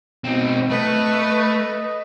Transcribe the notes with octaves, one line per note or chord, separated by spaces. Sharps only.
B2 C4 D#4
A3 B4 D#5